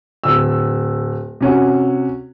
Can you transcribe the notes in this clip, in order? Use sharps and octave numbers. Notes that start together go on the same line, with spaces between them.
D1 E6
C3 C#4 F#4